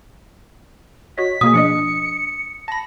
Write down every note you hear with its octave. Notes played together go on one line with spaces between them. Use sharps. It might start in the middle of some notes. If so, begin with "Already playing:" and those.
F#4 C#5 D#5 B6
B2 A#3 G#4 D#6
F3 D4 D#5 C#7
A5 B5 A#6